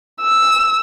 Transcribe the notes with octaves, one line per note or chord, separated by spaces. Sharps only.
E6